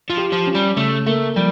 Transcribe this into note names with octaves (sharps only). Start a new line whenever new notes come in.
F3
G4
F3
C#4
G3
C#3 A3
A3 A#3
F3 G3